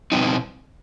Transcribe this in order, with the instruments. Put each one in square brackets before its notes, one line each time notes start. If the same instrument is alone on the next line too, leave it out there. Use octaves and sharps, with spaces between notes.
[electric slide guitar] B2 G3 C4 D#4